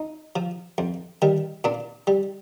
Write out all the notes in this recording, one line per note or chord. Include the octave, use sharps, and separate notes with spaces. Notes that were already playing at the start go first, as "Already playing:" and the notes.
Already playing: D#4
F3
F2
D#3 G3
A#2 D4
G3